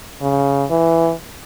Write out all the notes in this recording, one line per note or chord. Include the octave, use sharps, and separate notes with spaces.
C#3
E3